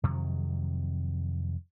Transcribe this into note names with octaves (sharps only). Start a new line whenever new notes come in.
F2 C3 D#3 F#3